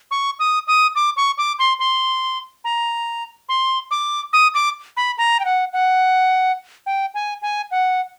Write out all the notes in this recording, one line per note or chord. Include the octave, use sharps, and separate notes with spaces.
C#6
D#6
D#6
D6
C#6
D6
C6
C6
A#5
C6
D6
D#6
D6
B5
A#5
G5
F#5
F#5
G5
G#5
G#5
F#5